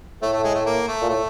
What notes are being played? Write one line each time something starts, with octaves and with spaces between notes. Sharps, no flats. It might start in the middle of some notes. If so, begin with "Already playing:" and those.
A2 A3
A3
G#3
A3
A#3
A3
A#2
A2 A3